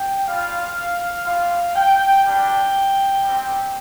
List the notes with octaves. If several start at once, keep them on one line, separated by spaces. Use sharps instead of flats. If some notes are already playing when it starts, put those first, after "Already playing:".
Already playing: G5
G3 F4 F5
G3 F4 F5
G5
G3 D4 G4 G5
G3 C4 G4